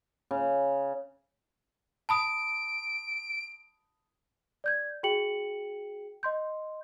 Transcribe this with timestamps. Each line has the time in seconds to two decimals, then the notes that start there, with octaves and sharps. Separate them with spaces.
0.31 C#3
2.09 A5 B5 D#6 D7
4.64 D5 G6 G#6
5.03 F#4 G#4 G5 C#7 F#7
6.23 D#5 C6 G6